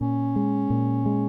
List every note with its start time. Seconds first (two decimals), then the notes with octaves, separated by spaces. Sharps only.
0.01 A#2 C#4
0.36 G#3
0.70 A#2
1.06 G#3